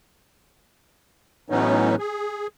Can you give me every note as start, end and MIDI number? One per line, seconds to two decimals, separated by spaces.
1.50 1.96 45
1.50 1.96 52
1.50 1.96 54
1.50 1.96 59
1.50 1.96 61
1.50 1.96 63
1.99 2.47 68